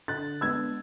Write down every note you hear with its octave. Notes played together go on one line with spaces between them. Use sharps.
D3 F#6 A6
G#3 B3 D4 E6 G#6